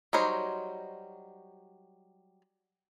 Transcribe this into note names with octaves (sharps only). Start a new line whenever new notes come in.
F#3 G3 D#4 C5 C#5